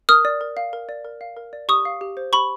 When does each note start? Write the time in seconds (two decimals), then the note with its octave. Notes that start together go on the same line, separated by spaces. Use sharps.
0.09 A#4 D#6 F6
0.25 D5
0.41 A#4
0.57 F5
0.73 A#4
0.89 D5
1.05 A#4
1.21 F5
1.37 A#4
1.53 D5
1.69 G4 C#6 D#6
1.85 F5
2.01 G4
2.17 C5
2.33 G4 B5 C#6